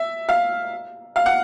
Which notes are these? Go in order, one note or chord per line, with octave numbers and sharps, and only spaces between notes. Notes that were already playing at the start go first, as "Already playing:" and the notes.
Already playing: E5
F5
F5
F#5